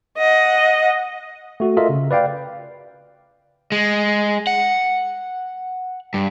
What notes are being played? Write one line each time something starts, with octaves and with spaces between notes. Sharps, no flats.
D#5 F#5
A3 F#4
F4 A4 A#4 D#5 E5
C#3
B4 D5 F5 G5
G#3
F#5
G2